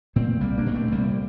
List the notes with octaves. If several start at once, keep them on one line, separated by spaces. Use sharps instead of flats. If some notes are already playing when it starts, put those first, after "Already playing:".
A#2 A3 C4
C2 G3 A#3
A#3 D4
A#2
A3 C4
C2 G3 A#3